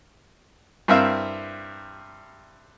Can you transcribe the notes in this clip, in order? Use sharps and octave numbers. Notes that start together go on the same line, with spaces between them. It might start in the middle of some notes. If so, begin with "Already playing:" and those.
G2 C4 E4 A#4 E5 F5